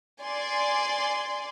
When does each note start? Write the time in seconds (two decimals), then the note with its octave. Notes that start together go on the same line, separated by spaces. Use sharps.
0.22 D5 G#5 C6